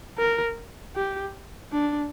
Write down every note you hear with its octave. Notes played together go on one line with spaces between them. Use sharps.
A#4
G4
D4